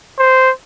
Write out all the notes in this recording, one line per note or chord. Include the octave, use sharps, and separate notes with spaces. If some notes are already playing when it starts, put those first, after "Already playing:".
C5